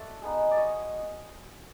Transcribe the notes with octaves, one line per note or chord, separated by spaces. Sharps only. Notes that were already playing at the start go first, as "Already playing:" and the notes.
Already playing: A3 F#4 D5 E5
G#3 B3 D#4
D5
C#5 D#5